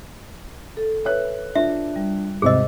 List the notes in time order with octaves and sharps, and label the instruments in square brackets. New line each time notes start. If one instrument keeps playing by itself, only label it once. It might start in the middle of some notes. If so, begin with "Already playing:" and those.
[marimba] A4
[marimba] B4 C#5 [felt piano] E5 F#6
[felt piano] D4 [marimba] F4 [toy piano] E5
[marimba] G3
[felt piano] G#1 C3 [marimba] D#2 C5 E6 [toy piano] G#4 D#5